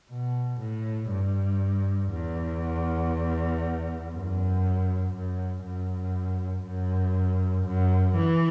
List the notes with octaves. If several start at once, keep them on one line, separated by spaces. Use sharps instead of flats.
B2
A2
G2
E2
F#2
F#2
F#2
F#2
F#2
E3